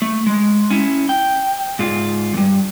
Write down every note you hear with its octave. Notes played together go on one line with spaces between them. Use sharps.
A3
G#3
C#4 E4
G5
G#2 F4
E2 G2